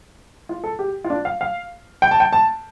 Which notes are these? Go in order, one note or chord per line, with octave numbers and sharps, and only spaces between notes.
F4
A4
G4
F4
D4
F5
F5
G5
A5
G5
A5